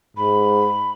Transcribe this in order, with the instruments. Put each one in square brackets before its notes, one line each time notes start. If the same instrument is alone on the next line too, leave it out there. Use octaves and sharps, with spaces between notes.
[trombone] G#2 [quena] B5